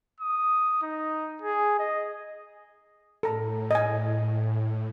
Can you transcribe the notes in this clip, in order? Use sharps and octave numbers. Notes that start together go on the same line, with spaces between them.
D#6
D#4
G#4
D#5
A2 A4 A#5
D#5 G#5